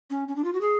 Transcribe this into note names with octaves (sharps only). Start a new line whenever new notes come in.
C#4
C#4
D4
F4
F#4
G#4